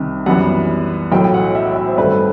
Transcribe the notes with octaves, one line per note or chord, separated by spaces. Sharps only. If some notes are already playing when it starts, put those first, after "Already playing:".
Already playing: C2 C3 D#3
F#2 E3 G3 B3 F#5
B1 A2 F#3 G5
G5
F#5
E5
F#5
E5
C5
G2 D#3 A3 C4 B4